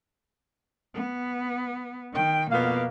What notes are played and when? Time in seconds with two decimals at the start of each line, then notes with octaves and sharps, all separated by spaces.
0.94 B3
2.14 D#3 G5
2.51 F2 B2 A#3 B3 F5